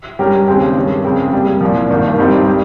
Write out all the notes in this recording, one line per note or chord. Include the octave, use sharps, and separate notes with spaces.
G2 G3 C#4 G4 A#4
D#2 C#3 G#3 C4 G4
G2 D#3 G3 C#4
F2 C#3 G#3 C4
C3 G3 A#3
C2 A#2 F3
G#1 G2 D#3 A#3
G#1 G2 G3 C4 D#4
G3